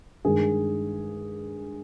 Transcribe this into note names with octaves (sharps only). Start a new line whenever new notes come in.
G2 D#3 G#3 G#4